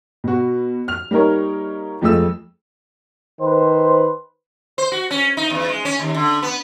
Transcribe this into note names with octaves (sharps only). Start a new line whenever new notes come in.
B2 F#4
F6 F7
G3 A#3 D#4 A#4 C#5
F2 F3 G#3 A3 E6
D#3 B4 C5
C5
F#4
C#4
D#4
E2
G#3
C#4
D#2
D3
B3